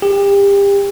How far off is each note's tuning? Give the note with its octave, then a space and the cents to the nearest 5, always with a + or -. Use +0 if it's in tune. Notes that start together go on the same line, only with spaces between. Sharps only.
G4 +30